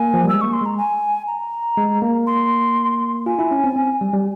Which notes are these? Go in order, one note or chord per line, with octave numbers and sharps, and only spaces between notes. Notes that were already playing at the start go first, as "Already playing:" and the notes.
Already playing: A#3 G#5
F3
G3 E6
G#3
A#3 C#6
C6
G#3 A#5
G#5
A#5
G#3
A#3
C6
F4 G#5
E4
C#4
C4
C4
G3
G3